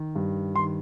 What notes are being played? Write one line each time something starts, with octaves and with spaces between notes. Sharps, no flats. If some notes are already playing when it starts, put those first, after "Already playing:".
Already playing: D#3
G2
D#3 C6